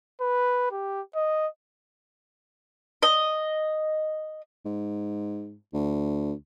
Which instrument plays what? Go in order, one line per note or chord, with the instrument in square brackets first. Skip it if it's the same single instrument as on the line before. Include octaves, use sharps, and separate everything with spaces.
[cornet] B4
G4
D#5
[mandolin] D#5
[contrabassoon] G#2
D2